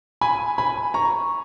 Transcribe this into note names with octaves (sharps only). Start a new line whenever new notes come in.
G#5 B5
G#5 B5
A#5 C#6